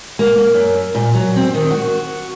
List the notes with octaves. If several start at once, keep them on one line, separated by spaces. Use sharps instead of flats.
A#3
A#3
F#2
A#2
F#3
C4
D#3
F#4